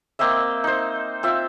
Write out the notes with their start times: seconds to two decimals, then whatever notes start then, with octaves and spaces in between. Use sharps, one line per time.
0.19 A#3 C4 D#5 E5
0.64 D#4 C5
1.23 C4 F4 E5